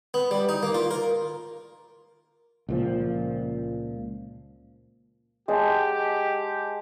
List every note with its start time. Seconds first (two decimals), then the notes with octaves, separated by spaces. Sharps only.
0.14 B3
0.31 G3
0.49 D#4
0.63 A#3
0.74 F4
0.91 A#4
2.69 C#2 A#2 F3
5.48 G#3 G4 F#5 A5